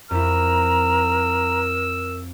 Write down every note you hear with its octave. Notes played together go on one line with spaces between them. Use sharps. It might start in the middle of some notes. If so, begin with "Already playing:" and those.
F2 E4 A#4 A#5 E6